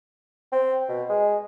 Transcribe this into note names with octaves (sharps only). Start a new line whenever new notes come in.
C4
B2
G#3